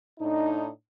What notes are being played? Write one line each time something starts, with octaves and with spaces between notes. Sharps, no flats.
A2 D4 D#4